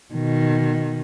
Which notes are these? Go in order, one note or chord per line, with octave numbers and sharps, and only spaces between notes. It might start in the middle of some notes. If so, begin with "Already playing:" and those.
B2 D#3